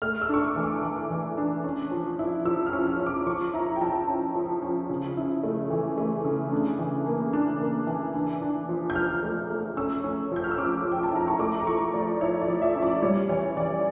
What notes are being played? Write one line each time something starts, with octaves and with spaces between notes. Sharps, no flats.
A3 F6
E6
D4 C#6
D6
E3
D6
E3
E3
D4
C#4
F3
E4
F3 E6
F6
C#4
F6
C#4
D6
F3 C#6
E4 A#5
G5
F3 A5
C#4
F3
C#4
C#3
E4
A3
E3
A3
C#3
D4
E3
A#3
D4
A#3
E3
D4
D4
F3
G6
F3 F6
A3
A3
C#4 E6
C#4
F3 G6
F6
E6
C#4 D6
F3
G5
A5
E4 A#5
C#6
A3 D6
A#5
F3 C#6
F3 D5
E4 C#5
D5
F3
E5
C#4
D5
G3 C#5
E3 C#5
E3 D5